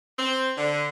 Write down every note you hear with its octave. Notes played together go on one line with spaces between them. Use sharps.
C4
D3